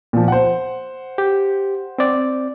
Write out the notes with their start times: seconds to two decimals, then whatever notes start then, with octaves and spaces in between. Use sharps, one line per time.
0.13 A#2 F3
0.28 C5 F#5
1.18 G4
1.98 C4 D5